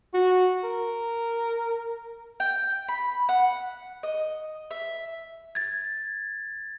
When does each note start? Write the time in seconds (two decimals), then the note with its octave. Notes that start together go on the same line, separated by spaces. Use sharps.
0.14 F#4
0.64 A#4
2.40 G5
2.88 B5
3.29 F#5
4.03 D#5
4.71 E5
5.55 G#6 A6